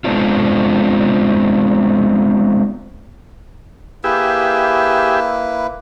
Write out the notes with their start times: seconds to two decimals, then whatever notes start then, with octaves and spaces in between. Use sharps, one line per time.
0.04 G#3 B3 C4 D4 F4
4.04 A#3 E4 G4 G#4 B4 E5